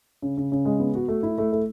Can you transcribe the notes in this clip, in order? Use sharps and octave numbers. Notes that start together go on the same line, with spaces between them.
C#3
C#3
C#3
G#3
B3
F#4
A3
E4
A3
A3